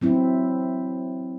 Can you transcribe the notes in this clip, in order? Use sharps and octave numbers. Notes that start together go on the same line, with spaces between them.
F#3 C4 E4